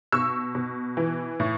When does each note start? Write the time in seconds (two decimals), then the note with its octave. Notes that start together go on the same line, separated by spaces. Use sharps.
0.12 B2 C#6 E6
0.55 B2
0.97 E3
1.40 A2